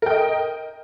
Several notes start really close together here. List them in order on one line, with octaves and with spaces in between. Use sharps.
A#4 G5 D#5